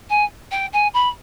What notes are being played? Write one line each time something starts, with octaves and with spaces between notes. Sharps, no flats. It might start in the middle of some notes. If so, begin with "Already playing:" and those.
G#5
G5
G#5
B5